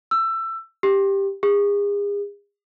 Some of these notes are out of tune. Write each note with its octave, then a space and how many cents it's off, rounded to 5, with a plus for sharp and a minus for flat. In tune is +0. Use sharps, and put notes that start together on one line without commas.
E6 +20
G4 +5
G#4 -40